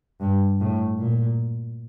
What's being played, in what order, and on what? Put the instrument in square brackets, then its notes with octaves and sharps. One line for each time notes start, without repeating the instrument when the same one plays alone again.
[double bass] G2
A2
A#2